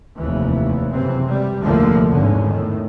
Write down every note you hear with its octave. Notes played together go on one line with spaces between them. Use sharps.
F1 D#2 E3
F#1 C3 E3 C4
G3
F1 D#2 A2 D3 F3 A#3
G#1 E2 D3 C#4
A2 D#3